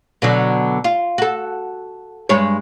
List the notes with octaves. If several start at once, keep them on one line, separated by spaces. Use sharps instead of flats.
B2 D3 F#3
F4
F#4 A4
G2 G#3 C#5